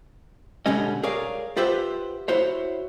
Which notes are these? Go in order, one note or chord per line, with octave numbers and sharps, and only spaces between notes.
B2 D3 G3 G#3 C#4 D#5
G#4 A#4 C#5 D5 F5
F4 G4 B4 C5 E5 F#5
E4 F#4 C5 C#5